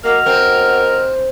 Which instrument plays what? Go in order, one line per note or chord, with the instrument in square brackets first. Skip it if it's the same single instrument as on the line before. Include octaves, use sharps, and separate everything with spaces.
[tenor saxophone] A#3 [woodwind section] F#4 D#5 F6
[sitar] C4 [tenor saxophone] A#4